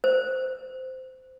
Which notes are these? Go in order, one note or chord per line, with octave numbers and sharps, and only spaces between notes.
C5